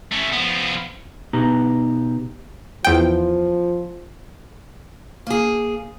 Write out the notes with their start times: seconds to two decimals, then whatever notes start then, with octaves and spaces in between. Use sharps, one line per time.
0.12 A3 C#4
0.32 F3 B3
1.33 B2 B3 D#4 G4 A#5
2.85 E2 F3 G5
5.27 A#3 G#4